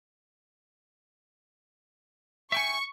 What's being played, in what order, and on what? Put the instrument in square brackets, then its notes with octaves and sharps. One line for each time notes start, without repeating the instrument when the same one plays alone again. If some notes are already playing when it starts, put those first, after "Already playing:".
[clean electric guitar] E5 G5 G#5 [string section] C#6